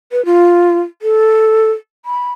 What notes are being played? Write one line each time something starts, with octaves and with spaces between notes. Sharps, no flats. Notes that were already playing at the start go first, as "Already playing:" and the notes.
B4
F4
A4
B5